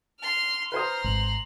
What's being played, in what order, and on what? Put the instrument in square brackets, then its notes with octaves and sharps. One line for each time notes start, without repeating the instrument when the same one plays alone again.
[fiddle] C6 F6
[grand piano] B4 C5 D#6 [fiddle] A#5 C6 [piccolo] F6
[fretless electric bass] G#1 [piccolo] F#7